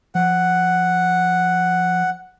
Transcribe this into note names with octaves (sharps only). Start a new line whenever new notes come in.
F3 F#5